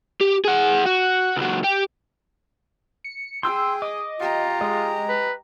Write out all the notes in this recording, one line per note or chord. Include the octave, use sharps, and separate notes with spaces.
G4
G#4 F#5
F#4
C#2 F#3
G4
C#7
G#4 G5 C6 E6
D#5 D6
F4 G4 A#5
G#3 D#5
B4